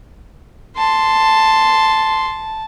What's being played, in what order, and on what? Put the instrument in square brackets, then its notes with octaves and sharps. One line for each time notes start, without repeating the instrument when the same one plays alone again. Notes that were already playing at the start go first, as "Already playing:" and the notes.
[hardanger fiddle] A5 [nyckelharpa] C6